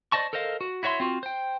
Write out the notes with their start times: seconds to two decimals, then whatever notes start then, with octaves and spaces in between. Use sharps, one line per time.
0.12 C5 D5 D#5 A5 C#6
0.33 A4 A#4 C5 D#5 F5
0.61 F#4
0.83 E4 F#4 C#5 E5 C6
1.00 C4 F4 F#4
1.23 C5 G5